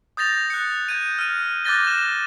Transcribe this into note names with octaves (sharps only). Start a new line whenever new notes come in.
D#6 G6 A6 A#6 F7
F#6 C#7
G6 G#6 D#7
F6 D#7
D6 F#6 G6 A6 A#6 G7
A#6 E7